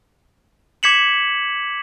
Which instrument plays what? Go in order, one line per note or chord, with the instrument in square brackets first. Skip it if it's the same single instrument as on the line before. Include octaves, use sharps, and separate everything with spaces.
[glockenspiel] D6 G#6 B6 C#7 E7 F#7